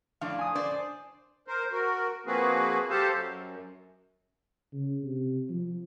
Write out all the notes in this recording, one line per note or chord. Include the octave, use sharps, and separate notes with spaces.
A2 F3 D4 F5
G#5 D#6
D4 C5 D5
A#4 C5
F#4 A#4
F3 A#3 C4 F#4 G#4 B4
G4 A4 C5 F5 A5
F#2
C#3
C3
F3